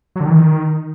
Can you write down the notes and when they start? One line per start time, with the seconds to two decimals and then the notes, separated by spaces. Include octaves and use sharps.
0.16 F#3
0.21 D3
0.26 D#3
0.31 E3
0.36 D#3